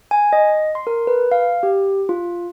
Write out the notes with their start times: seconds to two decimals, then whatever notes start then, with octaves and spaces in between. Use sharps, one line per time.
0.11 G#5
0.33 D#5
0.75 C6
0.87 A#4
1.07 B4
1.32 F5
1.63 G4
2.09 F4